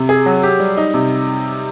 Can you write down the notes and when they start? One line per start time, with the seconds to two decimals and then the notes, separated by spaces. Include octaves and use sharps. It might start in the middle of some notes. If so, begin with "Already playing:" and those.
Already playing: C3
0.09 G#4
0.26 F#3
0.43 G4
0.60 G3
0.77 D#4
0.94 C3